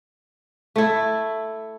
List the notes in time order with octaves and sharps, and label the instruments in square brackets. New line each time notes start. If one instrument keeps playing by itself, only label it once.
[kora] A3 E4